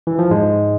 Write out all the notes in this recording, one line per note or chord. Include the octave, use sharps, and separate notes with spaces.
E3
F3
G#2 G#3